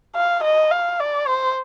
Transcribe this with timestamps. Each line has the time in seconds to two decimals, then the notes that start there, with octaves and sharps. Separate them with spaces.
0.16 F5
0.43 D#5
0.71 F5
1.00 D5
1.27 C5